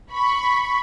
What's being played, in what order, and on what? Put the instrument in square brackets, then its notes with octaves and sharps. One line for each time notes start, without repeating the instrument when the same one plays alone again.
[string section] B5 C#6